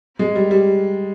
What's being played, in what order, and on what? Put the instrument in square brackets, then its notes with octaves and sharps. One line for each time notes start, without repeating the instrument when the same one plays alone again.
[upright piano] G#3
G3
G3